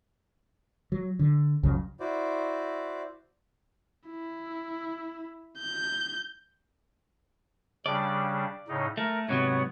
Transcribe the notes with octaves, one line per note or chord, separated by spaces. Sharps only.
F#3
D3
C2 F2 C#3 F#3
E4 F#4 C5 D5
E4
G6
C#3 G3 D4 D5
A2 C#3 D#4
A3 A#4
G#2 C3 F#3 B3 C#5 F#5